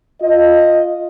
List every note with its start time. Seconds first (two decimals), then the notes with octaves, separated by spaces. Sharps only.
0.22 F4 D#5